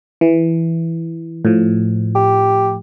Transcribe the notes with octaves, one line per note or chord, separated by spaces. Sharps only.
E3
A2 F3
G4